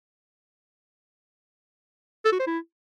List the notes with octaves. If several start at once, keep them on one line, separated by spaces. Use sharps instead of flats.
A4
F#4
C5
E4